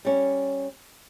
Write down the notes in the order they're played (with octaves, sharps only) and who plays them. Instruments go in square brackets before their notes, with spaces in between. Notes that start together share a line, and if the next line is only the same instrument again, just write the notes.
[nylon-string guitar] G3 C#4